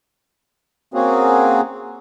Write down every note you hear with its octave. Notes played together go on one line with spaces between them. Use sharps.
A#3 C4 C#4 F#4 G#4